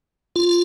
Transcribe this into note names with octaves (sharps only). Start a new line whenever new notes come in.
F4